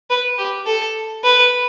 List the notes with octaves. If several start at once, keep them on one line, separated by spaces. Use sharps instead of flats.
B4
G4
A4
B4